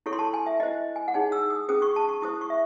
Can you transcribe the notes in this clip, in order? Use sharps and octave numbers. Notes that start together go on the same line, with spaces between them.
E4 A4 C#5 C#6
C6
A5
G#5
E5
E4 C5 D#5
G#5
F#5
D#4 G#4 C#5 G#5
E6
D#6
C#4 G#4 C5 D#6
C#6
A5
C#6
E4 C5 D#6
C#6
E5